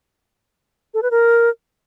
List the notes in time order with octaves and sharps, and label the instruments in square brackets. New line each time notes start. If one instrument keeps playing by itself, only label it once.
[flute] A4
B4
A#4